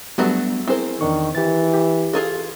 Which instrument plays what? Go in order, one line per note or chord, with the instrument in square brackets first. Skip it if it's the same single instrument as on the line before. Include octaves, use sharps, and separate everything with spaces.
[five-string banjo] F#3 A3 F#4 [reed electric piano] G3 B3 D4
[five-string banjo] C4 C5 [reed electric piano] E4 G#4 A#4
[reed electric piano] E2 D4 C#6 [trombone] D#3
[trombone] E3 [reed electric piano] G4 A6
[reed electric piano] G4
[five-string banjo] F4 G#4 A4